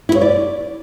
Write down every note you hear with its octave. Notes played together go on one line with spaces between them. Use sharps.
E4
C#5
D5